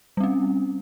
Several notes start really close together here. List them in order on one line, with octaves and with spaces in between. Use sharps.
G3 C4 C#4